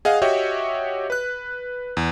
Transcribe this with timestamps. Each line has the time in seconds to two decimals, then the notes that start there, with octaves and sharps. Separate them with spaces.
0.05 G#4 D#5 F5 F#5
0.22 F#4 G4 C#5 D#5 E5 G5
1.10 B4 F#6
1.97 E2